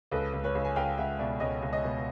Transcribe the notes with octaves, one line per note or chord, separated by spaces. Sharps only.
C#2 A4 B4
C#2
B4 C#5
C#2
G#5
C#2 F5 G5
C#2 E5 F#5
B2 D5 E5
C#2 C#5 D#5
C#2
C#5 D#5
B2